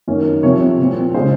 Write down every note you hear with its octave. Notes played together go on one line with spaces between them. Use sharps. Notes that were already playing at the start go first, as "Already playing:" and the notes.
F#2 D#3 A#3 C#4
C2 C3 F3 C4 C#5
C2 A#2 F3 C4
C#3 G#3 C#4 C5